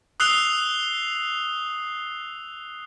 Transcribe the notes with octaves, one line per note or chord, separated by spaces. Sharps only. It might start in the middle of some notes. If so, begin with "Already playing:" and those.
D#6 E6 F#6 C7 F7 G7